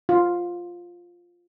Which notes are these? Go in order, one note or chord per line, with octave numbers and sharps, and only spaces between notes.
F4